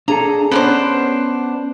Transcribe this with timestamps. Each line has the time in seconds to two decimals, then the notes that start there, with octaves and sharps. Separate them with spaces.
0.08 D4 G#4 A4 A#5
0.52 B3 C#4 D4 C5